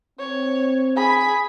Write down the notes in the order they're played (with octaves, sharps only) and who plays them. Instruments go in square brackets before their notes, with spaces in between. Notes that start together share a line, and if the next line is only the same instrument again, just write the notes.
[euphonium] C4 [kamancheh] C#5
[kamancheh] G#4 B5